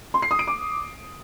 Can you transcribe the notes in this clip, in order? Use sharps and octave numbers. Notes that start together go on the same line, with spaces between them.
C6
C7
D#6
D7
D6